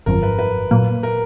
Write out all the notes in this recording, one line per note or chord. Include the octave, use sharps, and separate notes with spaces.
G#1 F#2 F3 A#4
B4
B4
A#2 F#3 A#3
A#4